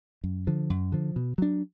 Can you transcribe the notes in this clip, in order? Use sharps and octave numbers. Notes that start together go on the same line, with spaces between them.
F#2
D3 F3
F#2
D3 F3
B2
F#3 D4